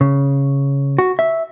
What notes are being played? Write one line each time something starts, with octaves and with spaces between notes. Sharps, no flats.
C#3
F#4
E5